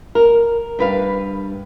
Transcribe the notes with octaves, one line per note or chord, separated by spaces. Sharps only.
A#4
G2 B4 F5